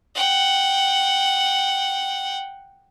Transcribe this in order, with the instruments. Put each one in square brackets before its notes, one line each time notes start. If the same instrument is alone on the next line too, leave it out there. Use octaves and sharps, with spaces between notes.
[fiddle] F#5 G5